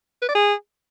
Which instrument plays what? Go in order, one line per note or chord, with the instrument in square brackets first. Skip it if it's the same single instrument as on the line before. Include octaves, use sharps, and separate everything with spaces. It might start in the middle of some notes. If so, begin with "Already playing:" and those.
[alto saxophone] B4
D5
G#4